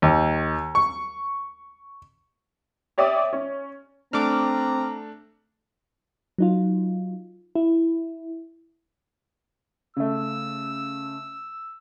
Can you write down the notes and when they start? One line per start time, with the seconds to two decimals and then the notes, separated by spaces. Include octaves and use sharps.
0.02 D#2
0.75 C#6
2.98 G4 C#5 D5 E5 D6 D#6
3.33 C#4
4.13 A3 C4 D4 A#5 D6 F6
6.38 F#3 D#4 F4
7.55 E4
9.97 C#3 A3 E6